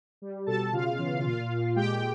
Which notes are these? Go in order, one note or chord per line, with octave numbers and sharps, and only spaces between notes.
G3
B2 A4 A5
C#3 F4 F5
E3
A#2 F4 F5
A#2
G#3 G4 G5